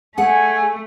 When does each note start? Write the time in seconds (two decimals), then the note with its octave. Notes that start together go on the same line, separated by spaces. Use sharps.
0.18 A3 G#4 F#5 G#5